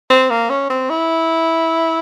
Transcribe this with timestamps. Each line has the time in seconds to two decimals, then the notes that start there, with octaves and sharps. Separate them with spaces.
0.10 C4
0.30 A#3
0.49 C#4
0.70 C4
0.90 E4